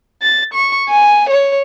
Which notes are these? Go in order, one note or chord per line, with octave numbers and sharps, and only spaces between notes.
A6
C#6
G#5
C#5